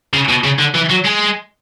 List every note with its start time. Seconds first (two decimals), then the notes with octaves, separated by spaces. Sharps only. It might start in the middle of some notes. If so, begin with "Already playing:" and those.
0.13 C#3
0.29 B2
0.44 C#3
0.59 D3
0.74 E3
0.89 F#3
1.05 G#3